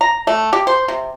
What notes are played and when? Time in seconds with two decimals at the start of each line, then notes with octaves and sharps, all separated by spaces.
0.01 A#5
0.27 A3
0.53 G4
0.67 C5
0.88 C3